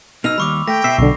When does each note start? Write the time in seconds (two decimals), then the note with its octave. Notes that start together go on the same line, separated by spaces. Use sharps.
0.24 B2 D#4 E6 F6 F7
0.38 D#2 G3 B5 C#6 D6
0.68 A3 G5 A#6
0.84 B2 E5 C7
0.98 B1 D3 C#6